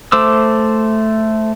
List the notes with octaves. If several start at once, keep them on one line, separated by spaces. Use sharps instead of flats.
A3 C5 D6 E6